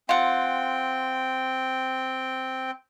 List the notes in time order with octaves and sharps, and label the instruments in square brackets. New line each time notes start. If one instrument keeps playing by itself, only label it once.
[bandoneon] C4 G5 [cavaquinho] F4 F#5